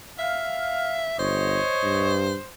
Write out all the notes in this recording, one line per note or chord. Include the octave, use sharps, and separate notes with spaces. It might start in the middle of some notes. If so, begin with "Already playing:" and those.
E5 F5
G1 C5 C#5 D#5
G2